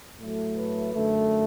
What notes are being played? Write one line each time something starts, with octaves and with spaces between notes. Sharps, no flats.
A2 F#3 A3
B4
F#2 D3 A3